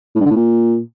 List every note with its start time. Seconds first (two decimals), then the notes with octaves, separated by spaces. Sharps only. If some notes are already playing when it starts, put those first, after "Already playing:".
0.15 A2
0.21 G2
0.26 D3
0.31 A2
0.36 A#2